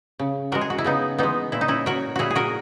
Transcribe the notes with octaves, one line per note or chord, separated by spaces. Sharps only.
C#3
E3 G#3 F#4 A#4
G#4
F#4
E4
C#3 B3 D#4
E3 G#3 B3 D#4
A#2 E4
D#4
C#4 E4
F#3 F#4 A#4
A#2 E4 F#4 G#4
G#4
F#4 A#4